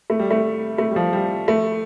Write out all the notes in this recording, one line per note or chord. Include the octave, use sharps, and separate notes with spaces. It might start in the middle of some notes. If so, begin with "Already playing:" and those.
A3
G3
A3
A3
G3
F3
G3
A3